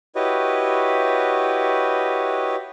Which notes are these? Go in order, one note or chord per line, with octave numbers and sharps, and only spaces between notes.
E4 F#4 G4 B4 C#5 D#5